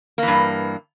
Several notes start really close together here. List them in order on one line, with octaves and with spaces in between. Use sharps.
A#3 E3 G2